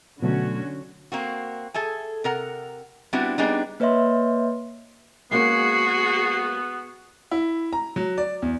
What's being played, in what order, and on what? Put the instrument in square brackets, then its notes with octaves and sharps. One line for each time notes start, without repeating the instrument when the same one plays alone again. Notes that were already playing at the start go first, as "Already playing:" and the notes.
[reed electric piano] B2 F#3 A3 [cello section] D3 C#4 F#4
[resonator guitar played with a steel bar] A#3 C4 F#4
G#4 A4 E5 G#5
C3 A#4 F#5
G3 B3 C4 D4 E4 F#4
G3 B3 C4 D4 D#4 G#4
[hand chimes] A#3 B4 C#5 D#5 E5 C6
[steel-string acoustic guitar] G#3 A#3 C#4 [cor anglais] B3 [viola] F#4 G#4 [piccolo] C7
[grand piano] E4
A#5
F#3
D5
E2